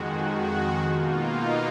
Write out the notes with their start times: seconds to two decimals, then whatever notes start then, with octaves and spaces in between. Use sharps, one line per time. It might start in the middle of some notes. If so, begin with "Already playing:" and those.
Already playing: F2 D#3 G#3 F#4
0.41 F#4
0.79 B2 A#3 D#4 F4